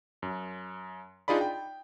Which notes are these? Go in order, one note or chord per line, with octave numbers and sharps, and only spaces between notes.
F#2
D4 D#4 F4 G#4 D5 B5
G5